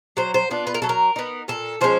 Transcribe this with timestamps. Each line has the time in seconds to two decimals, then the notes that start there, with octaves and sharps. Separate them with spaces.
0.17 F#3 C5
0.34 C5
0.50 B3 D4 F4
0.67 B4
0.74 A#4
0.82 F#3 A4
0.89 A#4
1.16 B3 D#4
1.48 A#2 A4
1.81 F3 G#3 C#4 C5